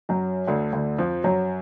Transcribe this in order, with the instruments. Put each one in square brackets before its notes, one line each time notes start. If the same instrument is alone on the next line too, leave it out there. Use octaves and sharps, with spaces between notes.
[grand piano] F#2 F#3
D2 D3
D2 D3
F2 F3
F#2 F#3